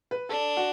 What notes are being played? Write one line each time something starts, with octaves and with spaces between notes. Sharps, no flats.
B4
D4 A4
F#4